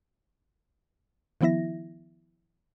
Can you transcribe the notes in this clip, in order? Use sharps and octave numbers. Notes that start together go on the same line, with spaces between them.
D#3 F3 B3 E4 E5 A#6